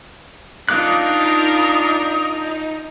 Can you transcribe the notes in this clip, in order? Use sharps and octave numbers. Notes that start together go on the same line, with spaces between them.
D4 D#4 F4 A#4 F5 D6 D#6 F#6